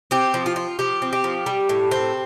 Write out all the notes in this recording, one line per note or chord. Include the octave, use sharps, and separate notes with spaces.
C4 G4
F3
F4
F4
F3 G4
C4
G4
F3
G3
A2
C4